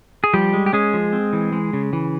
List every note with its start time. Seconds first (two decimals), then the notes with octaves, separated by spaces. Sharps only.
0.24 G#4
0.33 F3 G3 G4
0.53 G#3
0.66 G4
0.73 G#3 C#4 G#4
0.94 F3
1.13 C4
1.33 E3
1.53 G#3
1.73 C#3
1.93 E3